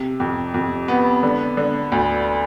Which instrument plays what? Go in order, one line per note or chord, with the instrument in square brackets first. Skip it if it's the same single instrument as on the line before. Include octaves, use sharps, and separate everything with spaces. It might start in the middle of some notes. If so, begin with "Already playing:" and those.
Already playing: [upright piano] C3
F2
F2
B3
D3
D3
D2